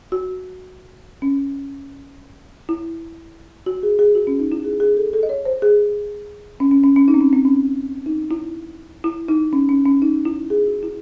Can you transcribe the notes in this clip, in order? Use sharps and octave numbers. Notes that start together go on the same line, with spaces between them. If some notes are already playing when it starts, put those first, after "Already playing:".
F#4
C#4
E4
F#4
G#4
G#4
F#4
C#4
D#4
E4
G#4
G#4
A4
A4
D#5
C#5
C5
G#4
C#4
C#4
C#4
C#4
D#4
C4
C#4
C4
C#4
D#4
E4
E4
D#4
C#4
C#4
C#4
D#4
E4
G#4
F#4
E4